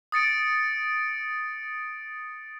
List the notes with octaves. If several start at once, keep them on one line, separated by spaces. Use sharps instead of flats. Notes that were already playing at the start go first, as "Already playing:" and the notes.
D#6 A6 C#7 D7